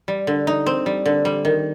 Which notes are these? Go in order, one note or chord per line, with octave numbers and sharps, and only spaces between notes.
G3
D3
D#4
C4
G3
D3
G3
D#3